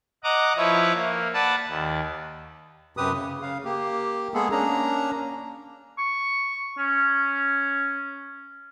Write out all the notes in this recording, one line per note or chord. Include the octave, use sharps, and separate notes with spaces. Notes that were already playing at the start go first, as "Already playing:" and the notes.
D#5 F#5 A#5 D6
F3 E4 B4 C#5 E5
A#3
B4 D5 F#5 A5
D#2
F#2 C3 G4 B4 D#6
C#3
C#3 F5
A#3 G4
G#3 A#3 B3 G#4 A4
A#3 C#4 D4 A#5
C#6
C#4